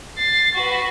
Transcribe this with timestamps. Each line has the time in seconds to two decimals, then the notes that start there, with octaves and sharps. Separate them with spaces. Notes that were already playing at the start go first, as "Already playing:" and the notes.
0.17 A6 C7
0.55 F#4 B4